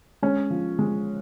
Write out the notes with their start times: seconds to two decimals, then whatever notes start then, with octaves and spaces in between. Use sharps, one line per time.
0.22 G#3 C#4
0.50 F3
0.79 G#3